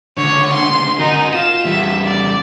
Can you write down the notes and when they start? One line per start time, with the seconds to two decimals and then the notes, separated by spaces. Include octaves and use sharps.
0.18 C#2 D3 C#5
0.53 C6
1.00 D#4 F#4 A#4
1.35 F4 E7
1.65 E2 G3 E5
2.05 D5